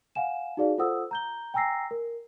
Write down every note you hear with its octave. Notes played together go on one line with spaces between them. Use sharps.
F5 F#5 G#5 E7
D#4 F#4 G#4 D5 F5
F4 A4 C5 F#5 D#6 E6
A#5 G6 G7
G5 G#5 A#5 E6 A#6 C7
A#4